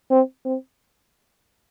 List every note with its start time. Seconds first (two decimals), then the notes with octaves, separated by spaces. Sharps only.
0.10 C4
0.45 C4